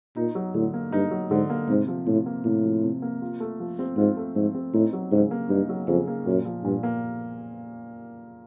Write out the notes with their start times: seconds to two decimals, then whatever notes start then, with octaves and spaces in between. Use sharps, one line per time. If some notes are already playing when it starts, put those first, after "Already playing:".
0.16 A#2 D#4
0.35 F#3
0.54 A2 D3
0.74 A#3
0.92 G2 D#4
1.11 F#3
1.31 G#2 D3
1.50 A#3
1.69 G#2 C3
1.88 F3
2.07 A2 C3
2.26 A#3
2.45 A2 C3
2.65 F3
2.83 C3
3.02 A#3
3.22 F4
3.40 A3
3.59 F3
3.79 C4
3.97 G#2 F4
4.17 A3
4.36 G#2 F3
4.55 C4
4.74 A2 D#4
4.93 F#3
5.12 G#2 C#3
5.31 A#3
5.49 G2 D#4
5.69 F#3
5.88 F2 C#3
6.07 A#3
6.26 F#2 A#2
6.45 F3
6.64 G2 A#2
6.83 A#3